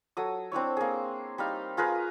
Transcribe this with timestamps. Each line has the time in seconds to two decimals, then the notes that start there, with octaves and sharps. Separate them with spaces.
0.17 F#3 A4 D#6
0.52 C4 D4 E4 C#5
0.77 A#3 G#4
1.38 G3 D#4 F5
1.77 F4 G#4 A#4 B4